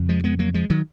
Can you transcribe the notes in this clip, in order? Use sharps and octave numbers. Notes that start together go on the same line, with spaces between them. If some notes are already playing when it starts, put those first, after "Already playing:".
Already playing: F2 C#3
F3 G#3
G#3 B3
F#3 A#3
F3 G#3
D#3 F#3